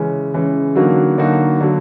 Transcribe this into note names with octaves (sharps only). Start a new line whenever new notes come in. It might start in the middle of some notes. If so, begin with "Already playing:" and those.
Already playing: C#3 E3 G#3 C#4
C#3 E3 G#3 C#4
D3 F#3 A#3 D#4 F#4
D3 F#3 A#3 D#4 F#4
D3 F#3